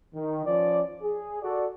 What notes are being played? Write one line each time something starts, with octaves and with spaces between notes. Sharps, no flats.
D#3
F3 C#4 D5
G#4
F#4 A4 D5